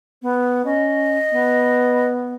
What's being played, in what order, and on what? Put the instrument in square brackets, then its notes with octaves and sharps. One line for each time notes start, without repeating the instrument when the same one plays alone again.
[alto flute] B3
[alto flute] C#4 [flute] D#5
[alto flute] B3